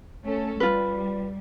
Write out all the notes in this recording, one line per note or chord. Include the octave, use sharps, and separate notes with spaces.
A3 C#4 A4
G3 F4 B4